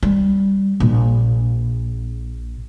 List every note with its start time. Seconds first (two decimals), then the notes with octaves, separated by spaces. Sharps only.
0.03 G3
0.80 A#1